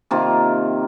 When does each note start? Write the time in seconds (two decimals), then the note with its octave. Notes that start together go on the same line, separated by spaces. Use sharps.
0.11 C3 D#3 A#3 F4